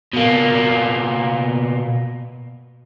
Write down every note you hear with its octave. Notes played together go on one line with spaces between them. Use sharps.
B2 A#3